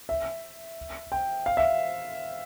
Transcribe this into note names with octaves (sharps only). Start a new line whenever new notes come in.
E5
G5
F5
E5